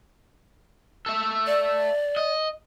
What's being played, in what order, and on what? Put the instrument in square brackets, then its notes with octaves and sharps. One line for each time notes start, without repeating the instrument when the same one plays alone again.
[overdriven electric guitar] A4 E5
[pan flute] D5
[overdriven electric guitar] D#5